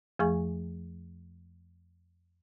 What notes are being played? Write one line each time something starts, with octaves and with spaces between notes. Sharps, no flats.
F2 F3 A3 G#4 G#5 C#6